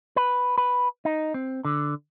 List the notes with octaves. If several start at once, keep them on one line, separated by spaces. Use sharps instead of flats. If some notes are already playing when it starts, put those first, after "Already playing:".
B4
B4
D#4
C4
D3